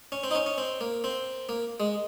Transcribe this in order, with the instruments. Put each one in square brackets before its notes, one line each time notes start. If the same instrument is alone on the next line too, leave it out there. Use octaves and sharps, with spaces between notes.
[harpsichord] C#4
C4
D#4
C#4
C#4
C4
A#3
C4
A#3
G#3